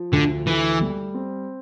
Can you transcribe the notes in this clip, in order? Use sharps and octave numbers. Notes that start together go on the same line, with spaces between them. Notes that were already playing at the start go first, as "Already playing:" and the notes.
Already playing: F3
D2 D3
E3 A3
G3
C4